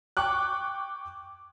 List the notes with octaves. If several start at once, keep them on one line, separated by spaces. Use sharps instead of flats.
G5 C#6 D6 F#6